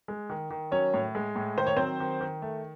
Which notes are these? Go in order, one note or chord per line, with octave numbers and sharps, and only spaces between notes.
G#3
D#3
D#3
F#3 C#4 C#5
A2
G#3
A2
D#3 C5
C#5
F#3 C4 C5
D#3
D#3
A3